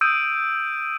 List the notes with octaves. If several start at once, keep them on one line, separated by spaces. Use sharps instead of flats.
D#6 E6 G6 D7 D#7